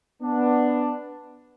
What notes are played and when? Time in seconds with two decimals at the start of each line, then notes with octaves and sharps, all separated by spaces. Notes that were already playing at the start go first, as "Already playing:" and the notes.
0.23 B3 D4